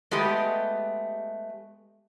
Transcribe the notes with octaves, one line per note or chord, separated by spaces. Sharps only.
G#3 A3 B3 G4 D#5 G5